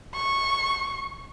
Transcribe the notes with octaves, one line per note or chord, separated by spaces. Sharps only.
C#6